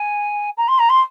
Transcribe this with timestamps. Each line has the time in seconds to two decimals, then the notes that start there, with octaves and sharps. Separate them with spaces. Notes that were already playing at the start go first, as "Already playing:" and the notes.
Already playing: G#5
0.57 A#5
0.68 C6
0.79 A#5
0.89 C6